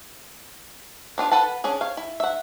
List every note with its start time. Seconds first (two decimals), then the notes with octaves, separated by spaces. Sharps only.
1.18 B3 D4 F4
1.31 A4 B4 F#5 A5
1.64 C#4 D4 G#4
1.81 C#5 F5
1.97 E4
2.20 E5 F#5